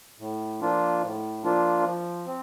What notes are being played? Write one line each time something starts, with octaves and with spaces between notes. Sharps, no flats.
A2
F3 A#3 D4 F4
A2
F3 A#3 D4 F4
F3
C4